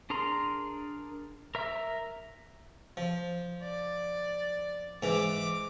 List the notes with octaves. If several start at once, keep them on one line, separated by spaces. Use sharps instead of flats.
D4 G#4 A#4 A#5 C6
A#4 E5 A#5
F3
D5
G#2 E3 D6